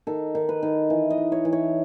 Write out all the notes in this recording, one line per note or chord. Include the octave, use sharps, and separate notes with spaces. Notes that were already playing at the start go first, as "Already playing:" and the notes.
D#3 A4
D#3
B4
D#3
E3
D#5
D#4
C#5
E3
C#5